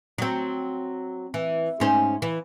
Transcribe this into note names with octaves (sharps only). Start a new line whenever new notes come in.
F#3 C4
E3
G#2 C#4 C5
E3